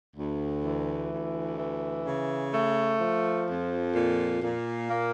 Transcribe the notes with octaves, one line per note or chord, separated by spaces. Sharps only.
D2
E3
D2
E3
C#3
A3
F3
F2
A#2
A#2
A#3